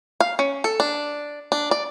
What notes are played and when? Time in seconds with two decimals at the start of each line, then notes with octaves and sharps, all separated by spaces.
0.20 F5
0.39 C#4
0.64 A4
0.80 D4
1.52 D4
1.71 D5